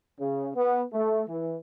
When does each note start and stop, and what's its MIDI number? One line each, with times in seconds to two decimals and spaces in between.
0.19 0.49 49
0.55 0.82 59
0.93 1.23 57
1.28 1.56 52